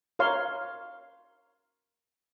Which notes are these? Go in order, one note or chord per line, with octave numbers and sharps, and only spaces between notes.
A#4 C#5 F5 C6